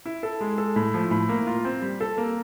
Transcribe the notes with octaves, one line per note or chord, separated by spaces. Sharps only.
E4
A4
G#3
A4
A2
F3
A2
A#3
F4
C4
G3
A4
A#3